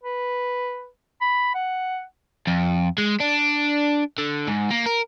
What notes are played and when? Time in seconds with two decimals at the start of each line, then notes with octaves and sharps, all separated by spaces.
0.03 B4
1.21 B5
1.55 F#5
2.47 F2
2.98 G#3
3.20 D4
4.18 D3
4.48 G#2
4.71 A#3
4.86 A#4